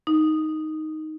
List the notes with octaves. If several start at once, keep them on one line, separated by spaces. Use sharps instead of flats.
D#4